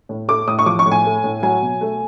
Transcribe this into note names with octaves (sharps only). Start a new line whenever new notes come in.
A2
A3 D6
A2 D#6
C#6
F3 D6
C#6
A2
G#5
A3
A2
F#3 G#5
B2
A3